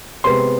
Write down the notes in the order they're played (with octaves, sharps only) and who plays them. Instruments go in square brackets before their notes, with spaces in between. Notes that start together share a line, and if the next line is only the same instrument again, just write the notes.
[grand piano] C3 G#3 B3 C6